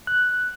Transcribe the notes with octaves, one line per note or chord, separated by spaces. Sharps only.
F#6